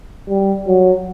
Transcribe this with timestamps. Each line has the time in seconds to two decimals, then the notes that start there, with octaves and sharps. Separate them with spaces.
0.29 G3
0.67 F#3